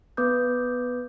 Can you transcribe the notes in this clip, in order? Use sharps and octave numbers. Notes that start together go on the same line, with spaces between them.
B3 B4 D6 D#6 G6